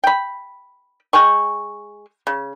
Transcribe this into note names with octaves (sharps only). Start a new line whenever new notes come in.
G5 B5
G#3 G5 G#5 C#6
C#3